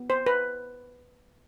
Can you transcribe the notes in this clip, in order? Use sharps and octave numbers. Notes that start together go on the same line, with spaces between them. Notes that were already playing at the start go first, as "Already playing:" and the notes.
Already playing: B3
C5
B4